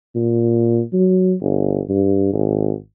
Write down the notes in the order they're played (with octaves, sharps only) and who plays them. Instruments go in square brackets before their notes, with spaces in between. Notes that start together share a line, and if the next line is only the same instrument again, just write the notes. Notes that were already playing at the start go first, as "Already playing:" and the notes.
[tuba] A#2
F#3
G1
G2
G#1